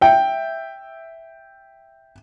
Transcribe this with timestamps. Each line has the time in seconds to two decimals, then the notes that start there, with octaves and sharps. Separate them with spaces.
0.01 E5 G5